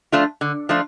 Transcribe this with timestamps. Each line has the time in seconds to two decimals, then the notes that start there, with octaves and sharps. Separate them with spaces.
0.12 F3 A3 D4 F4
0.41 D3
0.69 F3 A3 D4 F4